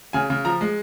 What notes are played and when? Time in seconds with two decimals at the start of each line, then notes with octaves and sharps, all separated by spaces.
0.13 C#3 G#5
0.30 C#3
0.45 F3 A#5
0.61 G#3